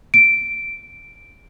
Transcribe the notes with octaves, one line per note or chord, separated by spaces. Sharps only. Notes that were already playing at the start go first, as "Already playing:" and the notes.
D7